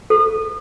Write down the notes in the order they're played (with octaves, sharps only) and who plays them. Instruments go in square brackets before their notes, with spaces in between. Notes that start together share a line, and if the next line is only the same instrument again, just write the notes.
[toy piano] A4